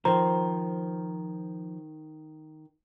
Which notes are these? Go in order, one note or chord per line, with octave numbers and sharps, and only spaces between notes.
D#3 F3 C5 A#5